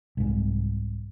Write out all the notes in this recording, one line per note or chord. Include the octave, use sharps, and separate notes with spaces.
C2 G#2